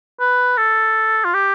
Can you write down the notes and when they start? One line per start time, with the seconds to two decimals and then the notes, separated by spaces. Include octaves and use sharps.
0.20 B4
0.58 A4
1.25 F4
1.34 G4